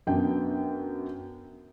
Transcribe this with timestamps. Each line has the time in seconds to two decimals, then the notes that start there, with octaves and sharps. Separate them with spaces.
0.07 F#2 B3 D4 G5